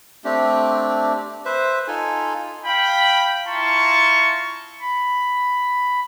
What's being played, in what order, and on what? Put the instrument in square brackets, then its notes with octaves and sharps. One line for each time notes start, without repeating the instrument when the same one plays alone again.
[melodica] A3 C4 D4 G4
B4 C5 E5
D#4 F4 A4 G#5
[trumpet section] F5 G5 B5
E4 F4 A5 A#5 C6 C#6
[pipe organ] B5